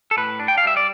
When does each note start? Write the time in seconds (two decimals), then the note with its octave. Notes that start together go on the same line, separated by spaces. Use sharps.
0.11 A4
0.17 A2 B4
0.39 D4
0.48 G5
0.58 F5
0.64 G3 E5
0.77 D5